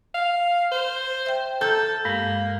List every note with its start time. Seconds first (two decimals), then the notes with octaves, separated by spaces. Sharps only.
0.15 F5
0.72 C5
1.26 E5 G5
1.61 A4 A5 A#5 F6 G6
2.05 G2 G#3 A#3